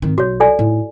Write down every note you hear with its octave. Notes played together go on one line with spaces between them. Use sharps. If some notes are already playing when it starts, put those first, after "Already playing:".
G#1 D#3
B1 F#4 C#5
A4 D5 G#5
A2 D#4